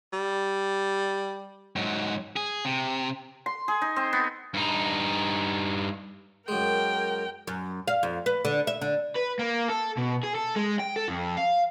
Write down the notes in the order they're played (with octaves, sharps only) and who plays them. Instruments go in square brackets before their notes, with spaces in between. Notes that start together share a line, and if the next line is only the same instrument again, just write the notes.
[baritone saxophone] G3
[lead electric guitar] G#2 F#3
G#4
C3
[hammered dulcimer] C6
G#4
D#4
C4
B3
[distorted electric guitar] G2 D#4
[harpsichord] F#2 G#3 [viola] A#4 G5
[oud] F#2
F5
F2
B4
D3
E5
D3
[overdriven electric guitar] B4
A#3
A4
B2
G#4
A4
G#3
G5
A4
F2
F5